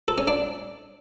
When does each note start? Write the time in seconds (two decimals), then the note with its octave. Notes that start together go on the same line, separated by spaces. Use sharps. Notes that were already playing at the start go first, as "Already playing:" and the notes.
0.08 A4
0.18 C#4
0.27 D4